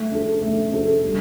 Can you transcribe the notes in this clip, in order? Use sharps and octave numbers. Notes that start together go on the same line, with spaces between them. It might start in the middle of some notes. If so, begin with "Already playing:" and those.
Already playing: A3
D4 A4
A3
D4 A4
G3